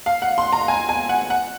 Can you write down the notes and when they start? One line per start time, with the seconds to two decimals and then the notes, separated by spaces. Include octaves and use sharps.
0.06 F5
0.22 F#5
0.38 C6
0.52 A#5
0.68 G#5
0.89 G#5
1.09 F#5
1.30 F#5